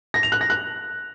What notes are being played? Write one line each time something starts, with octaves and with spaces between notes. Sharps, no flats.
A#6
F7
F#6
A#6
F#6